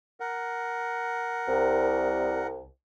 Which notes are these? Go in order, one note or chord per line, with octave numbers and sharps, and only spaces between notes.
A#4 F#5
C2